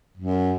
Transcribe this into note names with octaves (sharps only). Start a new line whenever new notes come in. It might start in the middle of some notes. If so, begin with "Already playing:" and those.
F#2